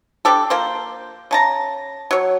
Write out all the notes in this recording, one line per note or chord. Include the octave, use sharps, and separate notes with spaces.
G3 D4 G4 A4
F3 A#3 C5
C#3 A5 A#5
F#3 C#5